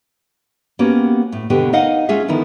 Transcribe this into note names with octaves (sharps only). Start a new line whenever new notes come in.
A#3 B3 C#4 F#4 G4
A2
D#2 B2 D3 B3 G4
D#4 A#4 D#5 F5 F#5
G#3 C#4 F4 G#4 E5
D3 D#3 F3 B3 D#4 E4